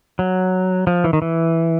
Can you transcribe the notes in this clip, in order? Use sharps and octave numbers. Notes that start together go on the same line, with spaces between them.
F#3
F3
E3
D#3
E3